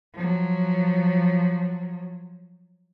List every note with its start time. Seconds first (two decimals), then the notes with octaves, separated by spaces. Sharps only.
0.14 F3 F#3